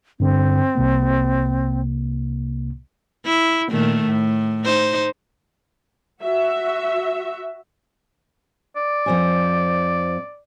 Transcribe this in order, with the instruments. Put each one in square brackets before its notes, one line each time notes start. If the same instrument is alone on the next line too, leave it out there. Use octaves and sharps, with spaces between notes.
[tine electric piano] G2 D3 [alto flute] C4
[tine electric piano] C2 C3 A#3
[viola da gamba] E4
A#2 D#3 A3
A2
D#4 C5
[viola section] F#4 E5
[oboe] D5
[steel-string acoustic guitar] F2 C5 G#5